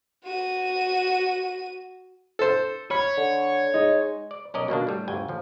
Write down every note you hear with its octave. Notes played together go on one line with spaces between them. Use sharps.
F#4 D#7
A4 C5
C#5 B5
D3
G#3 D#4
D5
B1 C#4 A#4 D5 D#5
B2 D#3 A#3 D4
A2 G3
G1 D2 G5 G#5
A1 F3